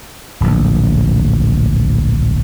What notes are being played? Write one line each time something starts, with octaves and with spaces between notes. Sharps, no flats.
D1 A#1